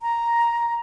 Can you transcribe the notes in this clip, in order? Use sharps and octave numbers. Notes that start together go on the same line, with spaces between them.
A#5